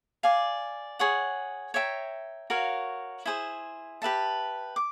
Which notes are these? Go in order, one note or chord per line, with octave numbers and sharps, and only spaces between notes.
D5 F5 G#5
G#4 C#5 F#5
C#5 E5 G5 A#5
F#4 A#4 C#5 F5
E4 G#4 C5
G4 B4 E5 A5
D6